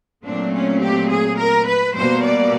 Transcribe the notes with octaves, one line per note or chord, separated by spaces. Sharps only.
A#2 F#3 A3 C4 D4
C#4
G4
G#4
A#4
B4
B2 G3 A#3 C5
D5